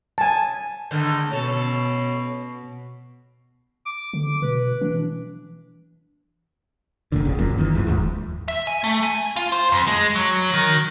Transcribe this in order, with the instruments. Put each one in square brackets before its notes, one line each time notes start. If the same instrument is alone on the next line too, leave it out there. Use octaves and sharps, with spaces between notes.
[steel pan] G#5 A5
[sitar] G#2 D3 D#3
[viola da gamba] B2 [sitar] C#4 A4
[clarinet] D6
[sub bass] D3
[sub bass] B2 [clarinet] B4
[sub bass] E3 [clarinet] D4
[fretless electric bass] F1 F2 A#2 D3
A#1 C#3
F#1 F#2 A#2
D#3 E3
E2 G#2 F3
D#1 D#2 G#2
[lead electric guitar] E5
G#5
A3
G#5
F4
C5
F2
G#3
F#3
D#3